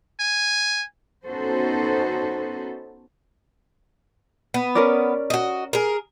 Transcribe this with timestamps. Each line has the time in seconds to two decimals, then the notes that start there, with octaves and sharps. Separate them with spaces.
0.20 G#5
1.26 B3 C#4 D#4 F#4 A4 C5
4.54 B3
4.75 C#4 A#4 D5
5.30 F#4 D#5
5.73 G#4 A#4